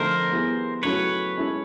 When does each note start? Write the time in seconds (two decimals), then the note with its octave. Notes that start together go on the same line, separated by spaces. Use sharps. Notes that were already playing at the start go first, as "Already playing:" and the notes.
Already playing: D3 F3 A3 C4 D#4 A#4 C5
0.30 G3 B3 E4 G#4
0.83 C#3 F#3 A3 C#4 E4 B4 C#5
1.37 G#3 C#4 E4 A4